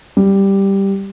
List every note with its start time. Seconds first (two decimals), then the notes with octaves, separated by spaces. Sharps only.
0.17 G3